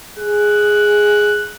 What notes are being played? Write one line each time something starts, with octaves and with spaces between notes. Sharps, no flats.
G#4 F#6